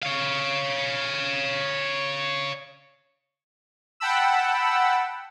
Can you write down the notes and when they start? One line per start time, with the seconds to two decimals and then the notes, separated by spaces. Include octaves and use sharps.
0.02 C#5 F5
4.00 F#5 G5 A5 B5 E6